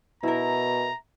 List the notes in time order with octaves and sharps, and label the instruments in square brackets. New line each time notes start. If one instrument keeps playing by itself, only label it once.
[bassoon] B2 [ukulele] E4 A#4 [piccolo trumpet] A#5